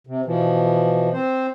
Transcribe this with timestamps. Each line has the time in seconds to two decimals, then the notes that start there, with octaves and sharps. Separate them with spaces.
0.07 C3
0.26 B2 E3 F3
1.13 C4 C5